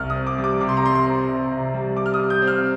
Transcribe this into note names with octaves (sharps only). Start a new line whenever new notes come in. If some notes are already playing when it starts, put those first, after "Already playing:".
Already playing: C2 F6
D#6
C4
D6
G3
D6
C3 D6
C6
A#5
G3 C6
C6
C4
C3
C3
G3
G3 D6
F6
D#6
G3
G6
C4
F6